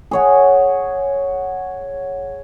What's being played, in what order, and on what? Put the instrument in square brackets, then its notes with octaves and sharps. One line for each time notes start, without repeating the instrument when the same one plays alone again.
[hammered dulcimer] G#4 C#5 F#5